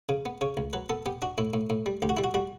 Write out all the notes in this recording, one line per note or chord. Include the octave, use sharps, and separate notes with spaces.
C#3
B3
C#3 C#5
C#2
F#3 B4
B3 A4
B3 G4
D4 F#4
A2 E4
A2
A2
G3
D2 G4
F#4
G3 E4
F#4
G3 F#4